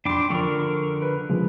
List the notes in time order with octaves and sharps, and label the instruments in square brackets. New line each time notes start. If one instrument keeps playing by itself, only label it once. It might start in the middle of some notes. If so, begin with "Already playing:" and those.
[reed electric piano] F2 [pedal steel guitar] D4 G5 D6 [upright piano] B5 C6
[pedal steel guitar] D3 A#4 [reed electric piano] F3 [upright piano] C#6
[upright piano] B4
[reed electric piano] C#3 F3 G#3